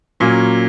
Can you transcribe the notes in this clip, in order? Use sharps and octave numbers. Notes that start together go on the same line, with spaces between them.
A#2 F#3 A#3 C#4